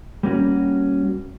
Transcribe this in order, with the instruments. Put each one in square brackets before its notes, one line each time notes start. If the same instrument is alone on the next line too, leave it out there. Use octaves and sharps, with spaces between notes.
[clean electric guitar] G3 A#3 C#4 F#4